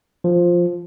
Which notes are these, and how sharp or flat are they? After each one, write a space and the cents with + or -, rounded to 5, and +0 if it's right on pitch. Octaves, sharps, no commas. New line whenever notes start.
F3 +5